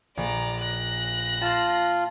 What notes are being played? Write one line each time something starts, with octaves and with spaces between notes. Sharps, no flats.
A#1 D5 A#5
F#6 A#6
F4 A5 C6